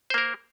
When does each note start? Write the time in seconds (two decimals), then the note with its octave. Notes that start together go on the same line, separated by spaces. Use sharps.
0.10 C5
0.14 A#3
0.18 A#4